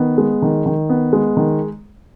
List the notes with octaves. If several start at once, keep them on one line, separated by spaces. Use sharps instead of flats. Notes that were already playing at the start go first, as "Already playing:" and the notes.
Already playing: D#3 B3
G#3
D#3
D#3
B3
G#3
D#3